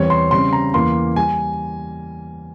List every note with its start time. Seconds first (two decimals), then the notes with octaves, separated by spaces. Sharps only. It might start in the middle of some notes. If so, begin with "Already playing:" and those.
Already playing: E2 E3 G3 C4 C#5
0.10 C6
0.31 C#3 G3 C4 C6
0.53 A#5
0.74 E2 E3 A#3 C6
1.16 G3 G#5